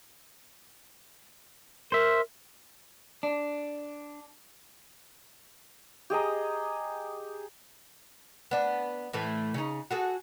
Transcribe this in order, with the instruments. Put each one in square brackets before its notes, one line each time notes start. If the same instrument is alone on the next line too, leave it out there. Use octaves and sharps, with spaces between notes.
[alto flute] A#4 [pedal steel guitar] C5 E5
[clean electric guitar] D4
[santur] G4 G#4 D#5 A#5
[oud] B3 D4
A2 E3 A3
C#3 D#4
F#4 G#4 A4